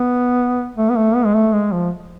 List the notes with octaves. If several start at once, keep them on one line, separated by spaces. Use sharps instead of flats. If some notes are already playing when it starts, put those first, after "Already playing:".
Already playing: B3
A3
B3
A3
B3
G#3
A3
G#3
F3